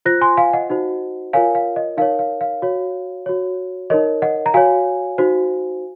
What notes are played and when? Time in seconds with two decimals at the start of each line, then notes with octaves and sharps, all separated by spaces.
0.05 F4 C5 F#6 A#6
0.21 G#5 C6
0.37 F5 G#5
0.53 D#5 F#5
0.70 D#4 F#4 C5
1.33 F4 A#4 C#5 F5 G#5
1.55 F5
1.76 D#5
1.97 D#4 A#4 C#5 F5
2.19 F5
2.41 F5
2.62 F#4 C#5
3.26 F#4 C#5
3.90 D#4 A#4 C#5 D#5
4.22 D#5 F#5
4.46 A#5
4.54 F#4 C#5 F5 G#5
5.18 D#4 F#4 C5